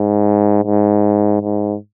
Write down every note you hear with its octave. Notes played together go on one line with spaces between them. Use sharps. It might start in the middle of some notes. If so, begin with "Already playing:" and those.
Already playing: G#2
G#2
G#2